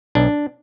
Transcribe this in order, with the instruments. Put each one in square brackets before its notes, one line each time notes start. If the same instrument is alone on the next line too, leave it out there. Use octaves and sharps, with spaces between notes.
[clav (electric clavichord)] B1 D4